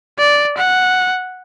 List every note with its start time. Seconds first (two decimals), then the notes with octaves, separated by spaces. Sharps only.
0.19 D5
0.57 F#5